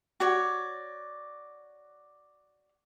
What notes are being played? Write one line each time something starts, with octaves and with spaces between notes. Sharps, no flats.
F#4 C#5 D5